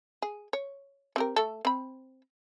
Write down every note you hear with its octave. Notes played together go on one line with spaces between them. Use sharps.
G#4
C#5
C4 G4 A#4
A3 A4
C4 B5